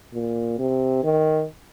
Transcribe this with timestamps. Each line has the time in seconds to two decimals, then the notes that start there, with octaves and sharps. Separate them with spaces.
0.13 A#2
0.58 C3
1.03 D#3